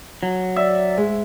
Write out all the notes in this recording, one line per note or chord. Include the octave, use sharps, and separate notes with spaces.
F#3
D5 E5
G#2 G#3